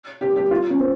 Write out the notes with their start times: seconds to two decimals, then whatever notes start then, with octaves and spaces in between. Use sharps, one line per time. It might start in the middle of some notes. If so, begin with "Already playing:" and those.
0.21 G4
0.36 G4
0.51 F4
0.70 C#4
0.79 C4